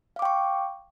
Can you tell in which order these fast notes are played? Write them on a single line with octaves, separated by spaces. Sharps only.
F5 D6 G5 C#6